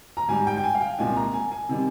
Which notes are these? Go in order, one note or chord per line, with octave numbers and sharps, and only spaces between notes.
A#5
G#2 G3 G#5
G5
G5
G#5
F5
G5
C2 A#2 G#3 G#5
A#5
G#5
G#5
C3 D#3 G3